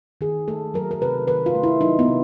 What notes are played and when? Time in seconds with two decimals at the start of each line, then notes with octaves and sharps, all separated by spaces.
0.21 D#3 G#4
0.48 A3 A4
0.74 F#3 A#4
0.91 A#4
1.01 C3 B4
1.28 D#3 B4
1.46 F4
1.55 A3
1.63 E4
1.81 F#3 D#4
1.99 B3
2.08 C3